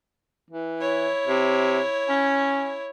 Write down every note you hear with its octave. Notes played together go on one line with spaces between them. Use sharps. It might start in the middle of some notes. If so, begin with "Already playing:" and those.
E3
E4 C#5
C3
C#4